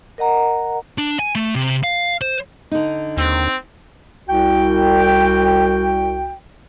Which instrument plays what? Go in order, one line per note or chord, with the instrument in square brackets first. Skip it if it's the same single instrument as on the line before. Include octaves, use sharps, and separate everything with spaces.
[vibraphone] A#4 D#5 F#5 A#5
[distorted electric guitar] D4
G#5
A3
C3
F5
C5
[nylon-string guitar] D3 D#4
[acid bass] D#2 [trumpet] C4
[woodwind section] C2 F#4 G5